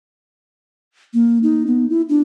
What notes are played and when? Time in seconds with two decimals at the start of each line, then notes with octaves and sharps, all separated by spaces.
1.14 A#3
1.43 D#4
1.67 B3
1.90 E4
2.09 D4